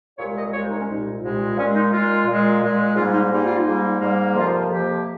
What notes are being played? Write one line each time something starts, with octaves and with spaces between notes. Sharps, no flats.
C2 A#2 G#3 C#5
D#5
C2 A#2 G#3 C#5
C5
D#4
C#4
C2 A#2 G#3 D#4
C2 A#2 G#3
A#2 G#3 C#4
D#4
A#2 G#3 F4
A#2 G#3
A#2 G#3
G#2 G3 A#3 F4
D#4
G#2 G3 A#3 D#4
F4
D#4
G#2 G3 A#3
G#2 G3 A#3
F2 C3 F3 A#3 F4
F2 C3 F3 A#3 G4